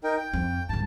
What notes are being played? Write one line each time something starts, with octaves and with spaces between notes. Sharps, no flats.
D#4 A#4 G5
G5
F2
C2 G#2 A5